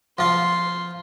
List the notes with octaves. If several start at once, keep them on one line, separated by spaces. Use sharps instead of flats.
F3 F4 C6